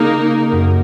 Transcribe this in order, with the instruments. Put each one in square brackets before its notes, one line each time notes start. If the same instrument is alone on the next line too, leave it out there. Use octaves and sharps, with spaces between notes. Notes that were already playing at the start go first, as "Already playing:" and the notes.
Already playing: [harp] C#3 [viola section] A#3 D#4 A#4
[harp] F#2